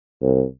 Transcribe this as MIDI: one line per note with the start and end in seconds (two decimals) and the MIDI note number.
0.22 0.43 36